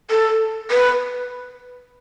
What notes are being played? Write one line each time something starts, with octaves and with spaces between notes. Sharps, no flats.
A4
B4